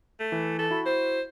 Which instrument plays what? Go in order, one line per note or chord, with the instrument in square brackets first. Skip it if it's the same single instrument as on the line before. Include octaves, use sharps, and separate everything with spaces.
[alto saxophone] A3
[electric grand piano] E3
[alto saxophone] A4
[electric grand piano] E4 F#4 B5
[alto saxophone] C5